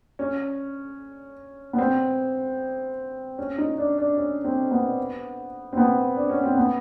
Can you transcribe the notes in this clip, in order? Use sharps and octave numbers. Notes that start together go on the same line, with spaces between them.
C#4
B3
C4
C#4
D#4
D4
D4
C#4
C4
B3
C4
B3
D4
C#4
C4
B3